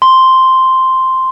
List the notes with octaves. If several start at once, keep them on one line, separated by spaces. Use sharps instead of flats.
C6